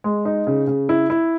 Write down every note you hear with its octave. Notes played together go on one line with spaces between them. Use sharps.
G#3
D#4
C#3
C#3
E4
E4